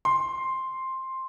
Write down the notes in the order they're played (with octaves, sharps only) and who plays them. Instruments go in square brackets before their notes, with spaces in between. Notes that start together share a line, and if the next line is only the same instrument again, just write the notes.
[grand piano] C6